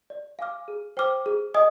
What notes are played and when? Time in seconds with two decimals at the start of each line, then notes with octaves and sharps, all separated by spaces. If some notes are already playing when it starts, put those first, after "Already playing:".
0.10 D5
0.39 F5 G#5 D6 F6
0.68 G#4
0.97 C5 G5 D6 F6
1.26 G#4
1.54 D#5 G#5 D#6